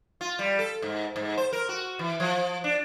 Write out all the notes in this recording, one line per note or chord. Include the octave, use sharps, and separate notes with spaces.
F4
G3
A4
G#2
G#2
C5
A#4
F#4
E3
F3
D4